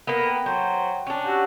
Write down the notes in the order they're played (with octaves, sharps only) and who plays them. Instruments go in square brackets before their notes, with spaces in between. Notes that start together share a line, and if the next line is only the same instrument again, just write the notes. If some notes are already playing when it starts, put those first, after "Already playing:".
[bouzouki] A#3 B3 [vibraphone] A#4 B5 [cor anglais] B4
[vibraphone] G5
[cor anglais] F#3 [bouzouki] C5
[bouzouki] C#4 D4
[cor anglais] F#4 [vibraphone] G4 E6